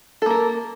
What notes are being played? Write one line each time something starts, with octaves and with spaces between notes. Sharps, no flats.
A#3 A4 A#4